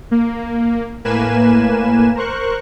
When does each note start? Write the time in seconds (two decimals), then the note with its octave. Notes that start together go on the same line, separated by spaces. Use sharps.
0.11 A#3
1.05 A2 A#3 B4 G#5 E7
2.15 A#4 C5 C#6 F#6